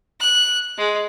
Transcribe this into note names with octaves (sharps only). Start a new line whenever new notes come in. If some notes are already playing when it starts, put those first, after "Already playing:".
F#6
G#3